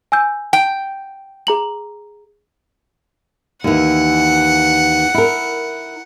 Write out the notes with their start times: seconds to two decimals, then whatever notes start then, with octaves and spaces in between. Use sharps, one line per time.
0.12 G#5 E6 G6
0.53 G5
1.47 G#4 A#5 F#7
3.64 D#2 E3 F#5
5.14 E4 A#4